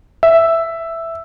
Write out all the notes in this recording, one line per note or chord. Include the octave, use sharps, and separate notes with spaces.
E5